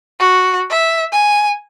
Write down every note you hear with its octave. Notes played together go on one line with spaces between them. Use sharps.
F#4
E5
G#5